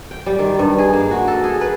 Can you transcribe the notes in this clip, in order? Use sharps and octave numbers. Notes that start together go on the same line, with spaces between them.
G5
G3
D#3
G2
G#4
A#3
F#4
A4
G#4
B4